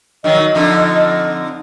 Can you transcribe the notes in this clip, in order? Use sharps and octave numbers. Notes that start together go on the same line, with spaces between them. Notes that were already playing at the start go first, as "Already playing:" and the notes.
D#3 F#3 D#5
F2 D3 D#4